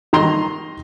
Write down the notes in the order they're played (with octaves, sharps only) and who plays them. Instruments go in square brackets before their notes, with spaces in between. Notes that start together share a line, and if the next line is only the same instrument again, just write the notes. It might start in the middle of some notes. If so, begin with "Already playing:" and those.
[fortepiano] D#3 A#5 C6